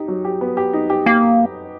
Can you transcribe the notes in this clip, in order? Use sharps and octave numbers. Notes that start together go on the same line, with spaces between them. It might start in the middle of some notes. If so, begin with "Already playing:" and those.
Already playing: D#4 G4
F#3
G4
B3
G4
D#4
G4
A#3 G4